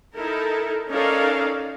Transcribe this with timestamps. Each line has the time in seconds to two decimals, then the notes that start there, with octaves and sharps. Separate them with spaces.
0.16 D#4 E4 A4 A#4
0.89 C#4 D#4 A4 A#4 D5 F5